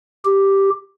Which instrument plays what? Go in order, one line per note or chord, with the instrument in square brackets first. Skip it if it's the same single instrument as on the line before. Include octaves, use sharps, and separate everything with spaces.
[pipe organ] G4